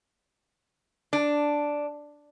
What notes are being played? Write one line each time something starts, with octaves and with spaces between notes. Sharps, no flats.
D4